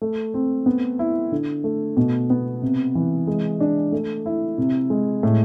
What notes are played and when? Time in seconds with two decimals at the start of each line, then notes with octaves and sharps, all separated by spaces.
0.02 A3
0.34 C4
0.66 B3
0.99 E4
1.32 D3
1.64 A3
1.97 B2
2.30 B3
2.62 C3
2.95 E3
3.27 G#3
3.60 D4
3.92 A3
4.26 E4
4.58 C3
4.90 G#3
5.23 A2